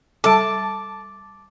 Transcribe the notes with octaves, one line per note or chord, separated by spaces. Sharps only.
G3 A4 A5 D6 A6 D7